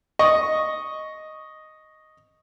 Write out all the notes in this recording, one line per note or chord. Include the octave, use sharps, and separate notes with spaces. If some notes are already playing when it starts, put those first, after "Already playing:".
D#5 C#6